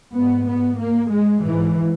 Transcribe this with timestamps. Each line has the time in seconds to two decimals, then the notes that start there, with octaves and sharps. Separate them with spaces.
0.14 G#2 B3
0.46 B3
0.79 A#3
1.10 G#3
1.43 G#2 E3